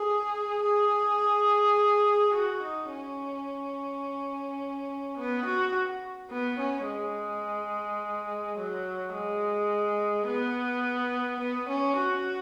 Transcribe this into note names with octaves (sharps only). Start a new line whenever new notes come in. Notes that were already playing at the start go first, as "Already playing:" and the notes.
Already playing: G#4
G#4
F#4
D#4
C#4
B3
F#4
B3
C#4
G#3
F#3
G#3
B3
B3
C#4
F#4